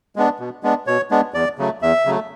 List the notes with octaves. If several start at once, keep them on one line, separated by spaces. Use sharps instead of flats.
G#3 B3 D4
B2
G#3 B3 D4
B2 C#5
G#3 B3 D4
E2 D5
C#3 F#3 A3
E2 E5
C#3 F#3 A3